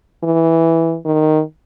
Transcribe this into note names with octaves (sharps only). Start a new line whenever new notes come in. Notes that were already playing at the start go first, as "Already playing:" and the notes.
E3
D#3